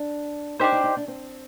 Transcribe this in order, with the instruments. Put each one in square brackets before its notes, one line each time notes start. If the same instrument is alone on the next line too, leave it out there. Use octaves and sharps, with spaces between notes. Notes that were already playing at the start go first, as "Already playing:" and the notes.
Already playing: [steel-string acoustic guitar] D4
[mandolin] D4 G4 C5 [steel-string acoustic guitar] D#4
[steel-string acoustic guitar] D#4
D#4
D4
C4